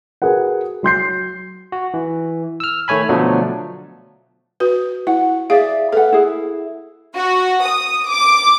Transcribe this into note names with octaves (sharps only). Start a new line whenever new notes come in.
F#4 G#4 A#4 B4 F#5
F#3 C6 G6 C7
F#4
E3
E6 F6
D#3 A3 C#5 G#5 B5
B2 D3 F3 F#3 A3 D4
F#4 B4
E4 F#5
G#4 D5 E5 F5
A4 B4 F#5
E4 G#4
F#4
D#6
D6